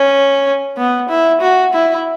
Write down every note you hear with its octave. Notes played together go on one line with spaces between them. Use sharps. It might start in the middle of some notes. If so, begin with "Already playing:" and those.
Already playing: C#4
B3
E4
F#4
E4